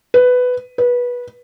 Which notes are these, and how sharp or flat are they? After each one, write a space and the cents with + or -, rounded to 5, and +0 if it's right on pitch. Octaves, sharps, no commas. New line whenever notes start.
B4 +10
B4 -20